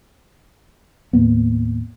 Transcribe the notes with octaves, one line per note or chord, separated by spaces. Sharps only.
D#2 A2 A#3 B3